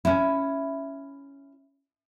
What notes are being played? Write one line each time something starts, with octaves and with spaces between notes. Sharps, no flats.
C#4 E4